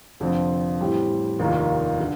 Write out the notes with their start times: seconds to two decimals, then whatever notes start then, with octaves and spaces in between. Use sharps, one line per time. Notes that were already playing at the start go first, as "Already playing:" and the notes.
0.20 F1 F2 D3 F3 C4
0.80 A1 A2 G3 C4 G4
1.39 F1 D#2 D#3 A#3 F4
2.00 D3